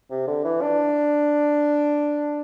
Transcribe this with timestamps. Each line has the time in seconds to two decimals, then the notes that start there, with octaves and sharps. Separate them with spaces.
0.11 C3
0.27 D3
0.45 E3
0.62 D4